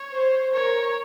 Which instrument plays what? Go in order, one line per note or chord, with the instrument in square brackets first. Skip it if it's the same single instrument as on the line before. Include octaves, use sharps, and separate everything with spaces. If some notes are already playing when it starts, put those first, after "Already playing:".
Already playing: [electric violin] C#5
[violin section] C5
[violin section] A#4 [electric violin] C#5